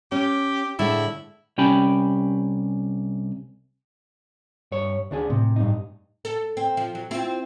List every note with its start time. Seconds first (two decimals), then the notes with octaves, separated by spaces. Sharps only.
0.12 C#4 G4
0.79 A2 D3 G#3 E4
1.58 C2 C#4 G4 G5 G#5 B5
4.72 G2 C#5
5.11 D2 D4 G#4
5.30 A2 C3
5.56 G2 D#4
6.25 A4
6.57 C4
6.77 F3
6.95 F#3
7.11 C4 E4 F4